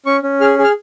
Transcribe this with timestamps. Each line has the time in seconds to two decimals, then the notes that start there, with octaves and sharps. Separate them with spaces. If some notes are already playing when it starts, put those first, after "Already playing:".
0.06 C#4 C#6
0.23 C#4
0.40 G#4 F6
0.58 G#4
0.64 F6